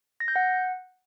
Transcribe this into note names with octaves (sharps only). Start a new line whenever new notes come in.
A#6
G6
F#5